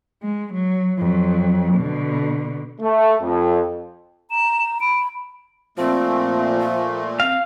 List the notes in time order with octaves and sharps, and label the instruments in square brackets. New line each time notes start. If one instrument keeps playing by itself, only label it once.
[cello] G#3
F#3
F2 F#3
B2 D3
[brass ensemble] A3
F2
[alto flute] A#5 [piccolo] E7
[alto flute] B5 [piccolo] D7
[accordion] A#2 A3 [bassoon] F3 [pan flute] C4
[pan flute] F4
[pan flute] C4 [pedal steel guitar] F5